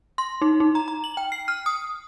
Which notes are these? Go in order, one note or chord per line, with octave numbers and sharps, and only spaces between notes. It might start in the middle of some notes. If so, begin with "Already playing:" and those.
C6
D#4
D#4
A#5
A#5
F#7
G5
C7
F6
D#6